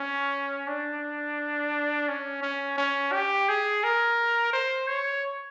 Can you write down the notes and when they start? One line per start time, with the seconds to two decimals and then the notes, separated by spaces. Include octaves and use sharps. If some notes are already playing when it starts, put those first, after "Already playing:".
Already playing: C#4
0.68 D4
2.09 C#4
2.43 C#4
2.78 C#4
3.12 G4
3.48 G#4
3.83 A#4
4.53 C5
4.88 C#5